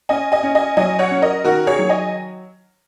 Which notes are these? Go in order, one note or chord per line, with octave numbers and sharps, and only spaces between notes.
C#4 D#5 G#5
D#5 G#5
C#4
D#5 G#5
F#3 D#5 G#5
C#5 F#5
C#4
A#4 D#5
D#3 F#4 A#4
G#4 C#5
F#3
D#5 G#5